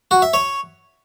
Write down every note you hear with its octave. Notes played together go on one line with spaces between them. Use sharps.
F#4
E5
C#5